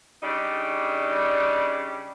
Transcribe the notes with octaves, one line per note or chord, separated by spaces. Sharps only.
C#3 G3 D4 D#4 D5